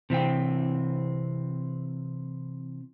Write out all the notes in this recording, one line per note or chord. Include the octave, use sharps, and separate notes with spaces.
C3 E3 C4 G5